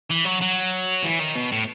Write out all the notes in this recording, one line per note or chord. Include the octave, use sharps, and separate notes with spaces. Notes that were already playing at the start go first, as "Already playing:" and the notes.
E3
F#3
F#3
E3
D#3
B2
A2